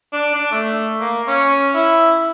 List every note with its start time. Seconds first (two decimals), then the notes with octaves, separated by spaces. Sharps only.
0.13 D4
0.35 D4
0.52 A3
1.01 A#3
1.27 C#4
1.74 E4